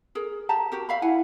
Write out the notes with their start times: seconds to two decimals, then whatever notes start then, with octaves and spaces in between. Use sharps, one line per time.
0.15 G#4 A#4
0.49 G4 A5 A#5
0.72 F#4 G4 A#4
0.89 E5 F5 B5
1.02 E4 F#5 G#5